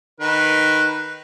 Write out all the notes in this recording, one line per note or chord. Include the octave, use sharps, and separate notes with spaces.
D#3 B4